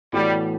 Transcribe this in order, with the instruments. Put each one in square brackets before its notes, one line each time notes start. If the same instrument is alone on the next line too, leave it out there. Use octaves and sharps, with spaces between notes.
[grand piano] A2 E3 B3 F#4 A4 [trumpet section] G3